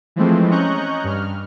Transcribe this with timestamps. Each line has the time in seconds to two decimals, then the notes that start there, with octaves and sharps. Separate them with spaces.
0.16 E3 F3 G#3 A3 C4
0.51 C#4 D#5 A#5 C#6 F#6 G6
1.04 G2 F6